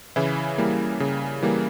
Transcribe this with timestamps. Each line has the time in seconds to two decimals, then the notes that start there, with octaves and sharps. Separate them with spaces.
0.16 C#3 E3 E4
0.58 E3 G3 A#3
1.00 C#3
1.42 E3 G3 A#3